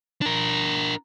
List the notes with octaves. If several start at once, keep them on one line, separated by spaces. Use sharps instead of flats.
D4 A#4